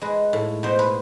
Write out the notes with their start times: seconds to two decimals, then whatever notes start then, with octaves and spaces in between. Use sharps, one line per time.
0.01 G#3 B4
0.33 A2
0.63 B2 C5
0.79 B4